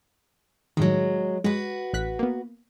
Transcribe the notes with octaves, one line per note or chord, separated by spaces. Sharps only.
A2 D#3 F#3 G#3
G#3 F#4 B4
A1 F#6 B6
A#3 B3